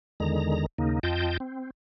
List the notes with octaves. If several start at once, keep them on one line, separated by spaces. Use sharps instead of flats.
E2 D3 D#3 G#3 A#5
D#2 C#3 A#3 D#4
F2 F4 D#5 G5 A5 G6
C4